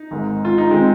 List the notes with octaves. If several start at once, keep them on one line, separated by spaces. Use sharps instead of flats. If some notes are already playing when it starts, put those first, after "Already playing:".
Already playing: D#4
G#1 G#2 G#3
F4
D#4
D#3 G#3 C4